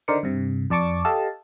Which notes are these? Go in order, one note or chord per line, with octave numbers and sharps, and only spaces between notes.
D3 D#4 A#4 C5 D5 C#7
G2 C3
F2 D5 A5 C#6 D6
G4 A4 D#5 F5 A5